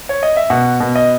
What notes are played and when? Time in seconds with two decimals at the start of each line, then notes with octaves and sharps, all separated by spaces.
0.09 C#5
0.23 D#5
0.37 E5
0.50 B2 F#5
0.80 B2
0.95 D#5